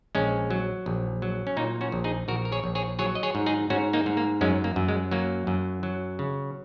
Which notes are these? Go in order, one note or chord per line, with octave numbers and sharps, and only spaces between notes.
A#1 G#3 C#4
F#3
A#1
F#3
C#4
A#2 A#3 D#4
C#4 F#4
A#1
D#4 G#4
A#1 F#4 A#4
A#4
G#4 C#5
A#1
G#4 C#5
F#3 G#4 C#5
D#5
G#4 C#5
G#2
D#4 G#4
G#2 C#4 F#4
A#3 D#4
G#2
A#3
F#2 G#3 C#4
A#3
F#2
G#3
F#3 A#3
F#2
F#3
C#3